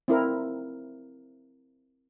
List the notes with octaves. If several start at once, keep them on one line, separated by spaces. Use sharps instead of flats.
C4 E4 A#4